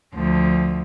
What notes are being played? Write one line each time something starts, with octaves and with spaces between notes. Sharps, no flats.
D2 F3